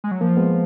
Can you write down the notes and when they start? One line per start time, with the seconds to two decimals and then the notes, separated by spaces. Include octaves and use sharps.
0.04 G#3
0.11 F#3
0.21 F3 A#3
0.37 G#3 B3